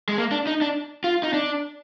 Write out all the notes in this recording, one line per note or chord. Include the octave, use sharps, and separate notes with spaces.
G#3
A#3
D4
D#4
D4
F4
D#4
D4